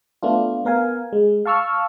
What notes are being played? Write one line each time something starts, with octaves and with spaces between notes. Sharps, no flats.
A3 B3 D4 F4
B3 A#4 F5 G#5
G#3
F5 A5 C#6 E6 F6